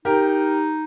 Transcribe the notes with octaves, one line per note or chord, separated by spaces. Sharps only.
D#4 G4 A#4